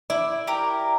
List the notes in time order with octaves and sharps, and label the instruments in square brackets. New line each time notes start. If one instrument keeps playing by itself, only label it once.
[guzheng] E4 [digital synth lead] D5
[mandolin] G4 A#4